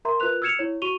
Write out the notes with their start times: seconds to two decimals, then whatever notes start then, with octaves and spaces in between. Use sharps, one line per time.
0.05 A#4 E5 A#5 C6
0.20 F4 A#4 B4 F#6 F7
0.42 E6 F6 G#6 C#7 E7 F7
0.59 E4 C#5
0.82 F#4 C#6 D#7 F7 G7